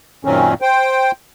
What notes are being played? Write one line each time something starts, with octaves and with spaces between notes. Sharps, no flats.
F#2 A#2 D#3 F#3 C4 C#4
C5 G5